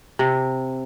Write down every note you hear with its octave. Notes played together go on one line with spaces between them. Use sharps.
C3